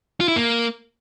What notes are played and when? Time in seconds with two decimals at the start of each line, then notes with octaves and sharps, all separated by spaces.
0.20 F4
0.28 E4
0.36 A#3